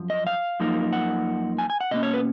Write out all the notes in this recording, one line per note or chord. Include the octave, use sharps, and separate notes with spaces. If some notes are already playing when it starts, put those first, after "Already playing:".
Already playing: F#2 F3
D#5
F5
F#2 F3 A#3 D#4
F#5
G#5
G#5
F#5
B2 A#3 C#4 D#5
C#5
B4